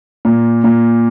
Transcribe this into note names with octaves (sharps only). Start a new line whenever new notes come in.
A#2
A#2